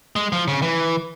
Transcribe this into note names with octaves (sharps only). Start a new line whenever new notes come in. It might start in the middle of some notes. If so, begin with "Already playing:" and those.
G#3
F3
C#3
E3